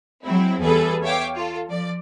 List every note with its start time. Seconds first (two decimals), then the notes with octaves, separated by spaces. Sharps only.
0.24 F#3 G#3 C4 E4
0.61 E2 G3 G#4 A4 B4
1.03 C#5 E5 F5 G5 D6
1.35 F4 A4
1.68 F3 D5